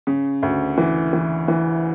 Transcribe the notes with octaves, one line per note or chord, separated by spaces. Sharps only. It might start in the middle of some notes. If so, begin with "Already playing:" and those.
C#3
D2
E3
E3
E3